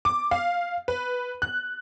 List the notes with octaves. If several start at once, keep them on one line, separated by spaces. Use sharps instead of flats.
D6
F5
B4
F#6